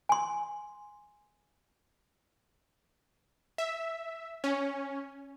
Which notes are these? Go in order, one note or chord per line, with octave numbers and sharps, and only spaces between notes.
G#5 C6
E5
C#4